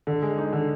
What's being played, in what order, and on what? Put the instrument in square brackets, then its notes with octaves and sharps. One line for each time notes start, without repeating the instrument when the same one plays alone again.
[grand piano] D3
G#3
D#4
D3